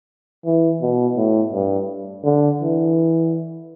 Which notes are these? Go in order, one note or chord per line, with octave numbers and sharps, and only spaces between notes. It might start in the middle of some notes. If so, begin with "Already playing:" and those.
E3
B2
A2
G2
D3
E3